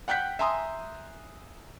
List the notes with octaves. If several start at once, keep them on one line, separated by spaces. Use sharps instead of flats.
F#5 G5 F#6 G6 B6
E5 G#5 A#5 C6 D#6